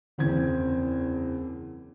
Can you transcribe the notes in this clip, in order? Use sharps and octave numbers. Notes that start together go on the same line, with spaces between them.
F#1 E2 C4 G#6